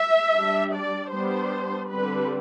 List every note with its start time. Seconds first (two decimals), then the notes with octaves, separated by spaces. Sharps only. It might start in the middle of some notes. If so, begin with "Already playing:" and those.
Already playing: E5
0.36 G3 D4
0.75 D5
1.12 G3 B3 D4 C5
1.89 D3 G3 C4 B4